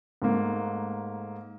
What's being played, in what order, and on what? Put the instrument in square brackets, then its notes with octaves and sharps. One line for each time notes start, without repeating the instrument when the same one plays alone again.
[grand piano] G#2 A3 A#3